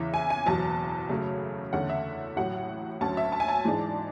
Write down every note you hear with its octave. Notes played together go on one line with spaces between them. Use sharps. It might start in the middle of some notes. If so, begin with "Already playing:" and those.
Already playing: E2 C#3 E3 E5
G#5
G#5
F#1 E2 B2 F#3 A5
F#2 C#3 F#3 A3
E2 D3 A3 C#4 F#5
E5
A1 A2 F#3 F#5
D2 D3 F#3 C#4 A5
E5
A5
G#5
A5
G#2 E3 G#3 D4